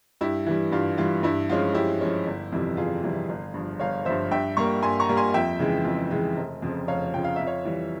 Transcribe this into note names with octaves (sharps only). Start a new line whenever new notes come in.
G2 E4 G4
E3 G3
G2 F4
E3 G3 F4
G2 E4
F3 G#3 C#4 F4
G2 E4 G4
F3 G#3 C#4
G1
F2 C3 E3 G3
G1 F4 G#4
F2 C3 E3 G3
G1
G2 F3
G1 C#5 F5
G2 F3 C5 E5
G2 E5 G5
G3 A#3 A#5 C#6
G2 G#5 C6
A#5 C#6
G3 A#3
G#5 C6
F2 E5 G5
C#3 E3 G#3
F2
C#3 E3 G#3
F1
F2 C#3 F3
F1 C#5 F5
F2 C#3 F3 G5
F5
F2 E5
C#5 F5
E3 G3